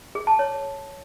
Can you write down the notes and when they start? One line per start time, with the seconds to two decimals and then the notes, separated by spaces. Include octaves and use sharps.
0.15 G#4
0.27 A5
0.39 C#5